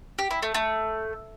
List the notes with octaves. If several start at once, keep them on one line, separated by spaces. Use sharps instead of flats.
G4
E4
A3
A3